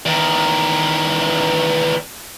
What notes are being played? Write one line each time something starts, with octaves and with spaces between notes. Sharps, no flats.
E2 D#3